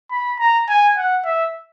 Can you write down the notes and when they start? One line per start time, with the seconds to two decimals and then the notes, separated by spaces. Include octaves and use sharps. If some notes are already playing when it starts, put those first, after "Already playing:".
0.11 B5
0.39 A#5
0.68 G#5
0.97 F#5
1.25 E5